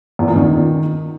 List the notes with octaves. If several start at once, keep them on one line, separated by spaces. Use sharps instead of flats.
E2
A#2
D#3